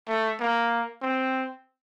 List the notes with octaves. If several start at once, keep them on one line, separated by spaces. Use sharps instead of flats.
A3
A#3
C4